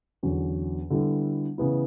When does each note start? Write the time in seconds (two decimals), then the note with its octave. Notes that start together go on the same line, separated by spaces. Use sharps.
0.23 E2 D3 F#3 C#4
0.90 D3 G3 B3 E4
1.58 C#3 E3 B3 E4